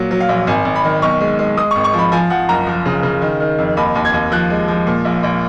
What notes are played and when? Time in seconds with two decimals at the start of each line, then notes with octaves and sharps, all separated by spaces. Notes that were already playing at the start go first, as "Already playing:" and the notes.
Already playing: A#2 F#3
0.11 F#3
0.20 F5
0.29 A#1
0.47 G#1 G#5
0.65 G#1
0.75 B5
0.84 D#3
1.02 B1 C#6
1.21 G#3
1.39 G#3
1.57 G#3 D#6
1.71 C#6
1.76 G#1
1.84 C#6
1.93 F3
1.98 B5
2.12 F3 G#5
2.30 F3 F#5
2.49 F#1 A#5
2.67 F3
2.85 C#3
3.03 C#3
3.22 D#3
3.40 D#3
3.59 F2
3.77 D#2 B5
3.95 D#2
4.05 G#6
4.13 D#2
4.32 F3 F#6
4.50 G#3
4.68 F3
4.87 A#2
5.05 A#1
5.23 A#1